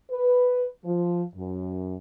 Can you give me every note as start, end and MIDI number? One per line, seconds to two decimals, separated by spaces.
0.11 0.66 71
0.85 1.23 53
1.35 1.96 42